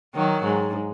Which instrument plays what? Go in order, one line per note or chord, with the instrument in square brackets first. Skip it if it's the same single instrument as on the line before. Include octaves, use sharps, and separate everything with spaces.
[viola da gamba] D#3 F#3
G#2